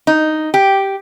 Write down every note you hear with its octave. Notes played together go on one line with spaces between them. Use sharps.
D#4
G4